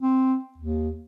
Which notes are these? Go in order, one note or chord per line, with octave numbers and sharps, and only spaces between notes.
C4
D#2